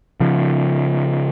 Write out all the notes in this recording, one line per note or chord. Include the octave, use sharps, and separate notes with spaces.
C#3 F3